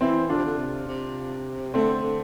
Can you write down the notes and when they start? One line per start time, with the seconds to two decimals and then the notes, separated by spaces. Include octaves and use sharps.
0.01 E3 C4 E4
0.29 D3 D4 F4
0.37 C3
0.45 D3
0.58 C3
0.87 C3
1.74 D3 A3 C4
2.03 D3